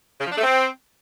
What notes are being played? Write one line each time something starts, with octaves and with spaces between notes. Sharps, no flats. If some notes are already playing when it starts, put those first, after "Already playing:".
C#3
F3
D4
A3
C4